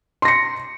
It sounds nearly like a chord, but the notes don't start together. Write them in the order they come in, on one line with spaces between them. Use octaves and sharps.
C6 A#6 C#7